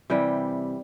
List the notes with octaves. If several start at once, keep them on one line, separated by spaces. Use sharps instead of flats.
C3 E3 G3 G5